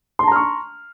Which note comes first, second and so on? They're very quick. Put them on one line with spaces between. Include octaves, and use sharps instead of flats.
C6 A5 A#5 F6 C#6